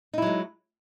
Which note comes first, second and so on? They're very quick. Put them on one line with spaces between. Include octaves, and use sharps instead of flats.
D#4 E4 F#3 G#3